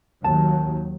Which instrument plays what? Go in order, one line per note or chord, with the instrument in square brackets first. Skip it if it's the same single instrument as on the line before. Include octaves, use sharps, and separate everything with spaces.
[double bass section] D#2 D#3 F#3 [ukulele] A5